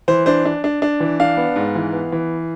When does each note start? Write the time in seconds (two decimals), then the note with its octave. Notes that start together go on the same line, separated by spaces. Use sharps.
0.08 E3 C5
0.26 D4 C5
0.45 D4
0.64 D4
0.82 D4
1.00 E3
1.20 D4 F5
1.37 B3
1.56 G#2
1.75 E3
1.93 B3
2.12 E3